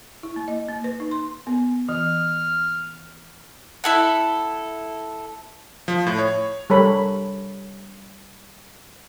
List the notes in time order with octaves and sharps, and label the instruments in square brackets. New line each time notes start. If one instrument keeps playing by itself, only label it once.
[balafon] E4
A#3
D#5
A#3
B4
D#4
C6
B3
[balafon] E3 [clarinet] F6
[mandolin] E4 A4 F#5
[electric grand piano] F3
A2
C#5
[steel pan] G3 A4 A#4 C#5 B5